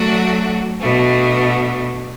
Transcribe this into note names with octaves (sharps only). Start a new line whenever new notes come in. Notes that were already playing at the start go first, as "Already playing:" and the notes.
Already playing: F#3 A3 D4 F#4
B2 A3 D4